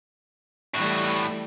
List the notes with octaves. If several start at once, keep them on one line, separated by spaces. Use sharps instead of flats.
A2 E3 G3 A3 F#4